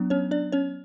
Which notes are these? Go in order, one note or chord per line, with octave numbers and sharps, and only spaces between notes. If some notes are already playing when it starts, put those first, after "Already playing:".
Already playing: F#3 B3 D4
C#4 C#5
D4 D5
C#4 C#5